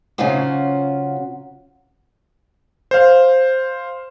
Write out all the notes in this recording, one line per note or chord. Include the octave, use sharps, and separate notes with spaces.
C#3 F#3 C#4 F4 F#4 C5
C5 F5